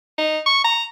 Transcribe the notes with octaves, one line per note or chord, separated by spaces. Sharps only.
D#4
C#6
A#5